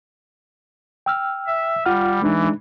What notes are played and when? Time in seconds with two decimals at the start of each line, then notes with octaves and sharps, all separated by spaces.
1.06 G5 E6 F6
1.47 E5
1.86 G3 F4 F#5 F6
2.22 E3 G#3 D4 D#4